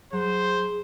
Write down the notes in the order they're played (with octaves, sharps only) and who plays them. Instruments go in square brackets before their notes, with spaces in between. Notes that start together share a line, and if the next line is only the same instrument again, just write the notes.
[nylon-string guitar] F#3 [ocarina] G#4 [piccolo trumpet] C5